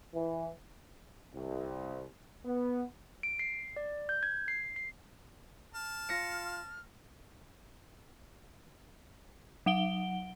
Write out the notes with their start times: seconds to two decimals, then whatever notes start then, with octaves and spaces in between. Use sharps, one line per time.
0.14 E3
1.34 C2
2.45 B3
3.23 D7
3.39 C7
3.76 D5
4.09 G6
4.23 G#6
4.48 C7
4.76 C7
5.74 A5 F6
6.09 F4 A#6 C#7
9.66 F#3 F#5 D7 G7